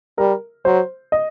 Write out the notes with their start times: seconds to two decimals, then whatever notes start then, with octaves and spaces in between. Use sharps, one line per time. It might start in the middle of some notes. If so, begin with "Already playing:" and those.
0.18 G3 A#4
0.65 F#3 C5
1.12 D#5